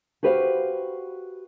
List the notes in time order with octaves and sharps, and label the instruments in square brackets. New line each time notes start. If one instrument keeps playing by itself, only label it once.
[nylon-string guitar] F#4 G4 B4 C5 E5 F5